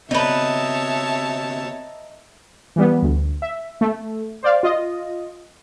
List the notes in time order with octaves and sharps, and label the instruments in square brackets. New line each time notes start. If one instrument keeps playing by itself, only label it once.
[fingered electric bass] C#3 B3 C4 [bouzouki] D#4 B4 [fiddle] C#5 A5 [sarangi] E5
[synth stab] E3 G3 B3
D2
E5
A3
C5 D5 F5
F4 D#5